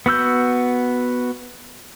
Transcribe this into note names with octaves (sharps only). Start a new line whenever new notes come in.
B3 F#4 E6 G6